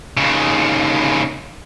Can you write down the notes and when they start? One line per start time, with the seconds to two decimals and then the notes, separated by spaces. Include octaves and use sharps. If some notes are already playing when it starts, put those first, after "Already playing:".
0.17 D#2 C#3